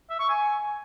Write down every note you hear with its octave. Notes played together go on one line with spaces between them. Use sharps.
E5
C#6
G#5